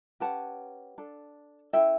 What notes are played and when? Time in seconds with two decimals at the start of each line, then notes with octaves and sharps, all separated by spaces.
0.20 C#4 G4 B4 F#5 A5
0.98 D4 A4
1.73 C#4 E4 A4 E5 G5